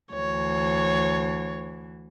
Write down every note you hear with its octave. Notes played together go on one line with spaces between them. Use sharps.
D2 E3 C#5